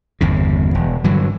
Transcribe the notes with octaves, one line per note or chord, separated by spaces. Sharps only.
G1 E2 C#3
E1
G2 D3 E3 F#3